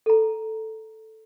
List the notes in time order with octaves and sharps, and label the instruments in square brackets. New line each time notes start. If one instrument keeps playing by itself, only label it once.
[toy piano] A4 A#5